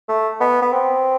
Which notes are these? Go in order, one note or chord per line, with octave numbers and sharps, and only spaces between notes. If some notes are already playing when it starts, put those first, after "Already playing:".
A3
B3
B3
C4